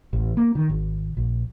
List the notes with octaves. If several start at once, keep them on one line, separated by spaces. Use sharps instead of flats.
A1
A#3
D#3
G#1
A#1